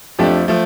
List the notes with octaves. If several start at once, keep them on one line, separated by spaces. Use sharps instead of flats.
F2 F3 A3 D4 G4
F3 A3